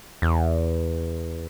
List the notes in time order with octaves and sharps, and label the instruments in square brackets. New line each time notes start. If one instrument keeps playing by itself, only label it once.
[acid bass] E2